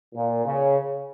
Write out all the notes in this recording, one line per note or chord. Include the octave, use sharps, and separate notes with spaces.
A#2
C#3